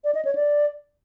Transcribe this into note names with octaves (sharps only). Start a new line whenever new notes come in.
D5
D#5
C#5
D5